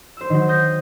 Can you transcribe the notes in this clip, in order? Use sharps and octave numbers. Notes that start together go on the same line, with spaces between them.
C5 E6
D#3 F#3
D#6 G6 A#6 C7